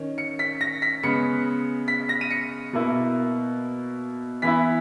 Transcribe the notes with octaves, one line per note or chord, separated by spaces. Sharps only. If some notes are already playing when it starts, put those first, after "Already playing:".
Already playing: D#3 C#4
C#7
B6
A#6
B6
C#3 G#3 B3 C#7
B6
A#6
D#7
C#7
B2 A#3 E4
E3 B3 E4 B6